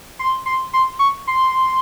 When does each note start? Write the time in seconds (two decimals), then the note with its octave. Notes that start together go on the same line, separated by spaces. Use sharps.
0.19 C6
0.46 C6
0.73 C6
0.99 C#6
1.27 C6